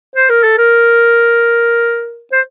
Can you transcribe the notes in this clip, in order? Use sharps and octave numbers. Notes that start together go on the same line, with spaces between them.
C5
A#4
A4
A#4
C5